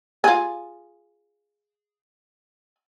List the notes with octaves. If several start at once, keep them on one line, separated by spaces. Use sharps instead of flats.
F4 G#4